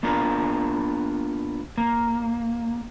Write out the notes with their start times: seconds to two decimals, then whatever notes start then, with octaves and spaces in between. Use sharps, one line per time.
0.03 A#3 B3 D4 F4 A#4
1.78 A#3